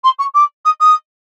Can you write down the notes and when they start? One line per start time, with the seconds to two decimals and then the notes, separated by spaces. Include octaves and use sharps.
0.03 C6
0.18 C#6
0.34 D6
0.65 D#6
0.80 D#6